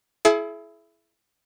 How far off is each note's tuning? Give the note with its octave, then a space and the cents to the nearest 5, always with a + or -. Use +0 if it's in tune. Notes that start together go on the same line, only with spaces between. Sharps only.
E4 +15 G#4 +40